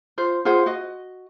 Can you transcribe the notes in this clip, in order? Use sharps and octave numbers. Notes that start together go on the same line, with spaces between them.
F4 C5
F4 G#4 C5 F#5
F#4 D#5